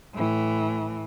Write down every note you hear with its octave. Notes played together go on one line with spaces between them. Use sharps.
A2 E3